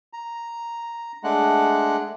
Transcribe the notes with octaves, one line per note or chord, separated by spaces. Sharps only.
A#5
G#3 A3 D4 F#5